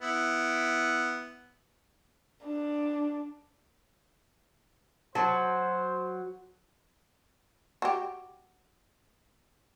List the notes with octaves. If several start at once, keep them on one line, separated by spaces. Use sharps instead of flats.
B3 E4
D4
F#3 C5 A5
F#4 G4